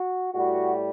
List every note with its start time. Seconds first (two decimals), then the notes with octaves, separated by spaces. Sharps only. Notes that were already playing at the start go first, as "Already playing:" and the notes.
Already playing: F#4
0.34 A2 G3 F#4